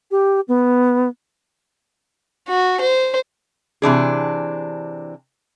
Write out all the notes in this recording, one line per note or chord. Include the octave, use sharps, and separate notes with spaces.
G4
B3
F#4
C5
C3 E3 D4 G#4